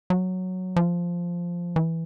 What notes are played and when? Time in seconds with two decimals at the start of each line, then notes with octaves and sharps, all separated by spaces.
0.10 F#3
0.76 F3
1.76 E3